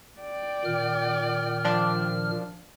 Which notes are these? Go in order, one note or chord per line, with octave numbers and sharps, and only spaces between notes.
D5 G5
A#2 D#3 F6
F3 D4